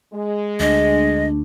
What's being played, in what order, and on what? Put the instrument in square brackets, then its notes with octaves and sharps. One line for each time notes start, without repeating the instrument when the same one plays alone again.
[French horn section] G#3
[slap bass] D2 [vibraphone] A3 D4 [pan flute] D#5